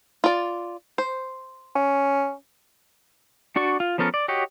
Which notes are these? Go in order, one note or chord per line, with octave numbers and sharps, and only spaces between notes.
F4 D5
C5
C#4
D4 F#4 D5 C#6
F4
F3 B3 C#4 A4 A#4
D5
F#4 G4 C#5 D#5